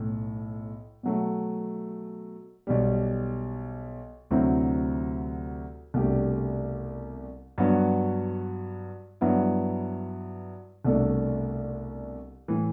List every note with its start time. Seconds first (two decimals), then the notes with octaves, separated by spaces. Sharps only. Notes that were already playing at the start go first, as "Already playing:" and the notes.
Already playing: B1 A2
1.03 B2 F#3 A3
2.67 B1 B2 G3
4.31 D2 C3 F#3 C4 E4
5.94 C2 B2 A3 D4 G4
7.58 G2 F#3 B3 F#4
9.21 G2 F#3 B3 E4
10.85 C2 B2 A3 D4 A4
12.48 A2 E3